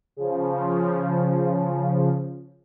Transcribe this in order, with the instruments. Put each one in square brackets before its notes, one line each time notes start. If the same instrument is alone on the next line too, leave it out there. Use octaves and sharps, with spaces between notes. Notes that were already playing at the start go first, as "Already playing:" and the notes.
[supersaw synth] C#3 F3